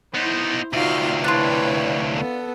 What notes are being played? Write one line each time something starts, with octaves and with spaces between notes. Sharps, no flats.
B3 D#4 E4 C5
D2 C3 D#4 F4 F#4 F5
D4 E4 F4 B4 C#5
B3 A4